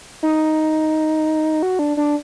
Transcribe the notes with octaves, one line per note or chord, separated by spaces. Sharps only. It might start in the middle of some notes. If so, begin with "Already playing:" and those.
D#4
F#4
D4
D4